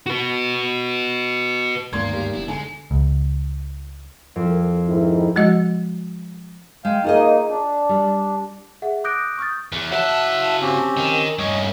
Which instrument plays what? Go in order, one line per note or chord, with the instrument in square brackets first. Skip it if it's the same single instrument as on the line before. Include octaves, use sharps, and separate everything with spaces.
[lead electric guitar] F#4 B4
[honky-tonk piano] G#1 [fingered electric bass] D2 G2 B3 [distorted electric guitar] A#3 [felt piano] C6 G#6
[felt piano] G3
[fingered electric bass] F1 B3 D4 [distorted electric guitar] E4
[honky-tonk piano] D3 [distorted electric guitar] G#3 [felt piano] G#5 C#7
[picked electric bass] C#2
[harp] F2
[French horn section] G#2 D#3 E4
[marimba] F3 G#3 F#4 D#5
[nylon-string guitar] G#3 [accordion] F5 G5
[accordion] A#3 D#4 [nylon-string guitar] F4 G#4 D#5
[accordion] D4
[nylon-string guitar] G3
[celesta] G#4 E5 F#5
D6 D#6 F#6 G6 A#6 D7
C#6 D#6 F6 G6 A6
[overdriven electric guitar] E2
[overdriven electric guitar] F#3 A5 [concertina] E5 F#5
[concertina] C4 C#4 G4
[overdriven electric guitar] D#3
[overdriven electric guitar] G2 C#4 [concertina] C#5 D#5